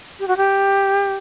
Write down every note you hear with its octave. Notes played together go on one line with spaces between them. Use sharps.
G4
F#4
G4